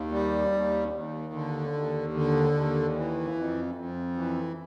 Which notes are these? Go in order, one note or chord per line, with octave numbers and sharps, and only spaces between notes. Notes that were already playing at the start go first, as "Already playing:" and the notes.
Already playing: D#2
G3
D#2
D#2
D3
D#2
D3
D#2
E3
F2
F2
E3